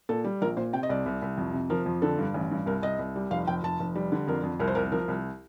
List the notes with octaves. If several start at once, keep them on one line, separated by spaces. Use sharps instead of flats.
A#2 A4
G3
A#1 A#4
A#2 C5
C3 G5
D#5
C2 D5
C2
C2
F2
C3
F3 A#4
F2
D3 A4
G2
A1
G2
C2 A#4
C2 D#5
C2
G3
F1 F5
F1 G5
F1 A5
F1
G3
D3
F2 A#4
F2
C2 A#4
C5
C2 A#4
F3 A#4
C2